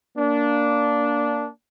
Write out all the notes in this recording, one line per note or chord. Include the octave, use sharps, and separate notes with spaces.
A#3 D4